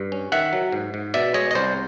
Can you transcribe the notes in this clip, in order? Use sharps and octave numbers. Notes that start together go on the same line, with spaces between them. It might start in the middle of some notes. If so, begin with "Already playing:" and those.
Already playing: G2
C#4
D#3 E5 F#5
F#3
G#2
G#2
B2 D5 E5
G#3 C#5 D#5
D#5
C2 C5 D5